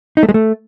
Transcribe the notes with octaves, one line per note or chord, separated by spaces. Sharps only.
D#4
A3
G#3
A3